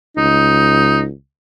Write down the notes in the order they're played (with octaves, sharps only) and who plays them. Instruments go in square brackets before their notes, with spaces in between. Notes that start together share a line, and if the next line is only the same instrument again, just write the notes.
[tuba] C#2 [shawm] D#4